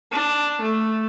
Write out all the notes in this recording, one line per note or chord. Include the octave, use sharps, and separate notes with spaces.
D4
A3